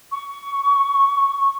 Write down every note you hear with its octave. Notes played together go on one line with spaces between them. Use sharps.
C#6